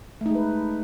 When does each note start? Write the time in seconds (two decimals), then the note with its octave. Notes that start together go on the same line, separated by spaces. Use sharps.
0.21 A3
0.26 D#4
0.30 G#3
0.35 B4